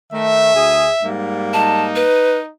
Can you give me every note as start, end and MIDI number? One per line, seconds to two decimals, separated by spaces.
0.13 0.53 51
0.13 0.53 57
0.13 1.09 76
0.55 0.89 38
0.55 0.89 68
1.03 2.04 44
1.03 2.04 55
1.03 2.04 58
1.53 2.51 63
1.53 1.84 81
1.96 2.37 71